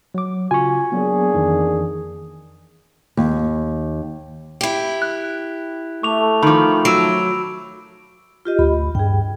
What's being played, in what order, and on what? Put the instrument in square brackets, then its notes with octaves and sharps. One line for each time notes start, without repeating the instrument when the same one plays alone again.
[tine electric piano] F#3 D6
[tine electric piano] C#3 F4 F#4 [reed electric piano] G#5 C#6
[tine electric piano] F#3 B3 [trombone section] A#3 D4 G#4
[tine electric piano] F2 D#3 E3
[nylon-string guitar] D#2
[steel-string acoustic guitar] E4 G4
[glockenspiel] F#6
[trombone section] A3 [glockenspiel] C#6 D6 F7
[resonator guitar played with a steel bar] D#3 F3 [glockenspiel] B5 D6
[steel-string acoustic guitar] F#3 [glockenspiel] E6 D7
[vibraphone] F4 G4 D#5
[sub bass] D2 [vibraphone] B5
[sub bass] G2 [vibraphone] G#4 G5